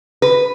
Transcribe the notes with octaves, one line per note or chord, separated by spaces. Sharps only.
B4